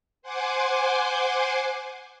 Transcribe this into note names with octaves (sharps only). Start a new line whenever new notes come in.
C5 F#5 G#5 C6 D6